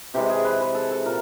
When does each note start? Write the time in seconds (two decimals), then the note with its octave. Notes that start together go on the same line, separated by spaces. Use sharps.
0.14 C3 E3 G#3 G4
0.30 G#4
0.45 B4
0.61 B4
0.75 A4
0.91 A4
1.05 A#2 A#4